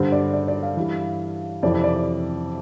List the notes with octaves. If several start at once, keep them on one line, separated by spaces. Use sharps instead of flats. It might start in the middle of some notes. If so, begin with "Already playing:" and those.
Already playing: G2 D3 C5
D5
D5
D5
F5
G2 E3
F2 C3 E3 D5
D5